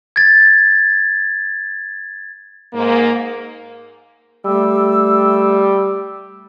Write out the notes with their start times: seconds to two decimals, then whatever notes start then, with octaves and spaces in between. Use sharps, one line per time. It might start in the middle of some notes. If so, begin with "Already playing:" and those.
0.16 G#6 A6
2.73 G#2 A#3
4.46 G3 A3 E6